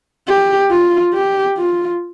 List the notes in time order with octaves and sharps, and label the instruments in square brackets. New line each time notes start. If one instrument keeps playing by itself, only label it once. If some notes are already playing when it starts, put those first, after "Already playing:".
[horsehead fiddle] G4
F4
G4
F4